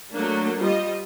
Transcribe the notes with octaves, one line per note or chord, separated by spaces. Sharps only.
F#3 A3 A#3 D4
F3 G3 F4 D#5